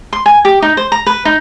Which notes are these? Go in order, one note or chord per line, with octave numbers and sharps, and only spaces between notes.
C6
G#5
G4
D#4
C5
A#5
B4
D#4